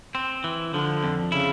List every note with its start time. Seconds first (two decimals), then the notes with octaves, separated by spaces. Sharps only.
0.15 C4
0.44 E3
0.74 D3 F3
1.04 F2
1.32 C#3 E4